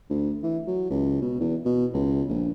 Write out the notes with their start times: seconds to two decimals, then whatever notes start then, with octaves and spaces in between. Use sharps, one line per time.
0.10 D2
0.43 E3
0.67 F#3
0.90 C#2
1.22 B2
1.40 E2
1.65 B2
1.93 C#2
2.29 A#1